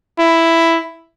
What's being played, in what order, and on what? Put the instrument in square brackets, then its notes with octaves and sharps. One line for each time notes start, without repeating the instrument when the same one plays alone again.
[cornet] E4